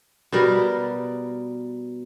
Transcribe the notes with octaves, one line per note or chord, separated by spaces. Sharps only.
B2 G3 A#4